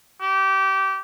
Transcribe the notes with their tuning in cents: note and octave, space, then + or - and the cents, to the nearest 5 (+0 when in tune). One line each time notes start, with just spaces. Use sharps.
G4 -25